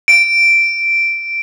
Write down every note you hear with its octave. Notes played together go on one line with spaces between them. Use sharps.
D7